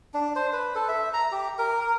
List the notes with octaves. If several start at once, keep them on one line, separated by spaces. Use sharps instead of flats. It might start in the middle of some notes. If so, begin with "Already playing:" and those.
D4
C5
B4
A4
E5
A#5
G4
A#4
A#4